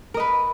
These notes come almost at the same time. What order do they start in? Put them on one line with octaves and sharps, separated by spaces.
A#4 D#5 B4